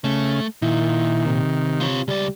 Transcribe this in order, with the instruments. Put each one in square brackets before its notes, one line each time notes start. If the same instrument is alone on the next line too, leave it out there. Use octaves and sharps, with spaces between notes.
[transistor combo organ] C#3 [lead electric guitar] A3
[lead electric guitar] A#2 [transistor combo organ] D#3 [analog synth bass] E4
[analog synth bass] C3
[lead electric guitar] F4 C#5
[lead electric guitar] C#2 D5 [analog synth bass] G3